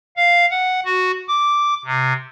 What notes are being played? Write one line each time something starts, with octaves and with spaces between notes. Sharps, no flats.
F5
F#5
F#4
D6
C3